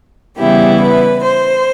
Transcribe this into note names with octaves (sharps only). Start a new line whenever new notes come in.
C#3 E3 G3 B3 E4 G4
B4
C5